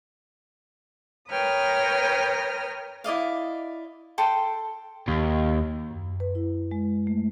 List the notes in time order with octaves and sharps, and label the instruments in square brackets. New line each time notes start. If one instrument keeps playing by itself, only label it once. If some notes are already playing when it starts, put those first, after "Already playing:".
[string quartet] A#4 B4 C#5 G5 D#6 F6
[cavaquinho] E4 D5 D#5 F5
A4 G5 C6
[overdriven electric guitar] D#2
[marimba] F#2
B4
E4
G#3
A3